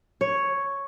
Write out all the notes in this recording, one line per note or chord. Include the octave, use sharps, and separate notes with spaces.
C#5